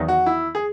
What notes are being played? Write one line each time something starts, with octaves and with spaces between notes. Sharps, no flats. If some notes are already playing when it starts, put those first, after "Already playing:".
Already playing: E2 D#3 F#3 B3 D#4
F#4
E4
G#4